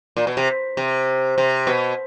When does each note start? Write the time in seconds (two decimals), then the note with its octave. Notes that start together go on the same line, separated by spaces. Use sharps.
0.17 A#2
0.27 B2
0.37 C3
0.77 C3
1.38 C3
1.67 B2